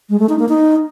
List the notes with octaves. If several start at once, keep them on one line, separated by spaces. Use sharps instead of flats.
G#3
A3
D#4
A#3
D#4